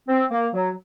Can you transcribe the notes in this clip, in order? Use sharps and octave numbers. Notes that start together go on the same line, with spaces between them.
C4
A#3
F#3